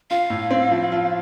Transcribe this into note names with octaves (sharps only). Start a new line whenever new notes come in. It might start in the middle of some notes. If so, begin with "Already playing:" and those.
F4 F5
A2
C4
F3
F4